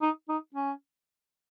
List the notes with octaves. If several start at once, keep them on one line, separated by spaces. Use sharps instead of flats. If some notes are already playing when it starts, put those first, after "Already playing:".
D#4
D#4
C#4